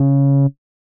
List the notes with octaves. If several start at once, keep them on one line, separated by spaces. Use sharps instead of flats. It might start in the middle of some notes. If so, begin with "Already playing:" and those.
Already playing: C#3